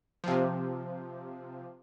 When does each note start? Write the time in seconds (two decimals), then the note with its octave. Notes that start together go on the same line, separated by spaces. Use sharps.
0.24 C3 F3